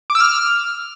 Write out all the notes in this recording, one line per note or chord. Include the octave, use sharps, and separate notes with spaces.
D6
E6
F6